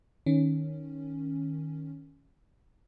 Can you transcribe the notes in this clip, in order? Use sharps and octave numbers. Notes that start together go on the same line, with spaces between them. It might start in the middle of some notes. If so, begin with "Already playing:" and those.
D#3 C#4